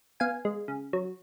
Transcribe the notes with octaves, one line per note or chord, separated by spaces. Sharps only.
B3 F5 G#5
G#3
C#3
F#3